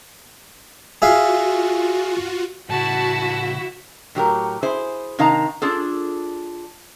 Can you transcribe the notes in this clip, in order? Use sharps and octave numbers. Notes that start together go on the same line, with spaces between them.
F4 F#4 G#4 E5 F5
A2 C#3 E4 F#4 E5 A5
A2 F#3 G4 A#4
E4 G#4 C5
C3 D#3 D#4 F5 A5 A#5
D4 F4 G#4 A4